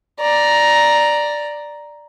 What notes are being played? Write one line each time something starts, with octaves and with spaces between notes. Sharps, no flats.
D5 A#5